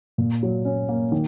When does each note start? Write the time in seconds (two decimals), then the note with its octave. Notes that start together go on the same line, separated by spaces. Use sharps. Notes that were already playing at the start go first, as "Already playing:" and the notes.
0.18 A#2
0.43 F#3
0.65 C#4
0.89 A#3
1.12 D#3